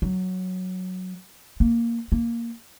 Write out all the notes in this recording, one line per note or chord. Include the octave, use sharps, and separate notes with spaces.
F#3
A#3
A#3